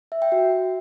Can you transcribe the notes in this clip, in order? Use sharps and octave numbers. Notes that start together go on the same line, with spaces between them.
E5
G5
F#4